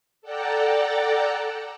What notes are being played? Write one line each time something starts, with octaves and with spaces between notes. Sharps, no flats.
A4 D5 F#5 G5 A5 A#5